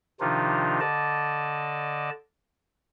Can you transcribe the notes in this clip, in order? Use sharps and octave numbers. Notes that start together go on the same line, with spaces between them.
C3 D#3 F3 D4 D#4 F4
D3 D5 D#5 A5